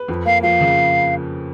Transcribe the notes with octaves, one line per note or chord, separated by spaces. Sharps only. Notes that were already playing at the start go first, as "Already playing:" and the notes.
Already playing: B4
F2
A#3 F5
F3 F5
C#3